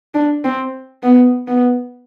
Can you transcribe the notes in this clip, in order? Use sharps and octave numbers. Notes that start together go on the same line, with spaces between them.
D4
C4
B3
B3